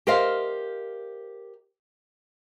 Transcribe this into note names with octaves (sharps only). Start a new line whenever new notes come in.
G4 A#4 C5 D#5 F5